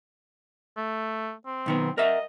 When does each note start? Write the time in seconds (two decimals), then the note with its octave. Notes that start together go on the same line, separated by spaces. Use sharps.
0.77 A3
1.46 C4
1.66 B1 D#3 B3
1.98 A#4 D#5 E5 F#5